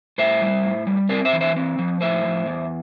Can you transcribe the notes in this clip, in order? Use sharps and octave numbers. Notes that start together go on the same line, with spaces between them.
A2 C5 E5
G3
A2
G3
C4 A#4 D5
C5 E5
E3
C5 E5
C4
F3
A2 C5 E5
F3
E2